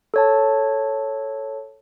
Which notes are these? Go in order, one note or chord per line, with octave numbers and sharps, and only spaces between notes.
A4 C#5 A5